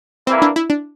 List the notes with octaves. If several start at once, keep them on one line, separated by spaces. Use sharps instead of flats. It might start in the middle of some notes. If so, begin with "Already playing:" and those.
E3 G3 A#3 C4 E4
D4
E4
D4